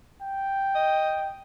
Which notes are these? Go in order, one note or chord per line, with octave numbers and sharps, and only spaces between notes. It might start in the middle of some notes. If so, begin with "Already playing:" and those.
G5
D#5